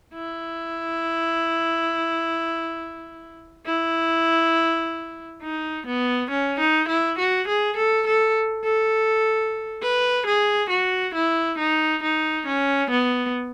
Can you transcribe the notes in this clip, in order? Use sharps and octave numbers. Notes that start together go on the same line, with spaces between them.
E4
E4
D#4
B3
C#4
D#4
E4
F#4
G#4
A4
A4
A4
B4
G#4
F#4
E4
D#4
D#4
C#4
B3